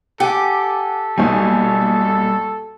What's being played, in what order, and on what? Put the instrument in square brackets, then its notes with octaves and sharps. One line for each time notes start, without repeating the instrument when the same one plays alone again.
[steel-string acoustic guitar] G4 [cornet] A4 [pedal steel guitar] F#5 G#5 D6
[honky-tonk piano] B1 A#2 G#5 [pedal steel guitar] G3 C#5 D#5